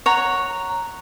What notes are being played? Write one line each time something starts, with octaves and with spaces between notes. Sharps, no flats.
C#5 F#5 A#5